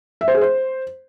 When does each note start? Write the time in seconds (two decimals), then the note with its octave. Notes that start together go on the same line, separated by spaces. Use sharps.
0.21 E5
0.28 C5
0.35 G#4
0.41 C5